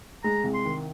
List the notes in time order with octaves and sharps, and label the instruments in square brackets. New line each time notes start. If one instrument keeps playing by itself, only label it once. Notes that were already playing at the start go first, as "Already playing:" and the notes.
[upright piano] G#3 [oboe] A#5
[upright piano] C2
[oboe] C6
[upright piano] D#3